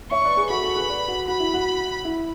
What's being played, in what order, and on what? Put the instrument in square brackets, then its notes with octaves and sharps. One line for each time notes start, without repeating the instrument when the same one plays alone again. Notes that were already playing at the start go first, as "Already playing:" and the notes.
[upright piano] C#5 E5 [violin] C#6
[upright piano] B4 D5
G#4 B4
[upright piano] F#4 A4 [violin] B5
[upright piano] F#4 A4
G#4 B4
B4 D5
F#4
[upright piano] F#4 [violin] B5
[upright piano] E4
F#4
E4